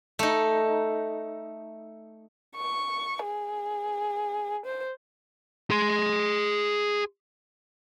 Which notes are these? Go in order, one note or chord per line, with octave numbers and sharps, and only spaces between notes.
A3 D#4
C#6
G#4
C5
G#4 C6